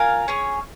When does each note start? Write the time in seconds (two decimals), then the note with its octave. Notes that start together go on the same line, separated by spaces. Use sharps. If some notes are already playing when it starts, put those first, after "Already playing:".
Already playing: F4 A#4 F5 G#5
0.28 C#4 G#4 C#5